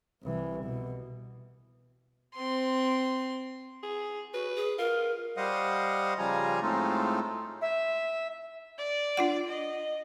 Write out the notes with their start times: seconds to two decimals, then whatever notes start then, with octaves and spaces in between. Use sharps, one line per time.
0.23 C2 E3
0.64 B2
2.36 C4 C6
3.83 G#4
4.34 F#4 B4
4.56 G#4
4.78 F4 A#4
5.37 G3 C5 D#5 F5 F#5 D#6
6.19 C#3 F3 G3 F4 G#5 A#5
6.62 A2 G#3 A3 C4 D#4 F4
7.61 E5
8.79 D5
9.17 D4 F4 F#5
9.48 D#5